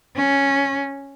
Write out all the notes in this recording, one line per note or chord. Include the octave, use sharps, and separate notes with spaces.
C#4